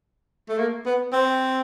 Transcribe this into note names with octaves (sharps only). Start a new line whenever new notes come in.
A3
A#3
B3
C4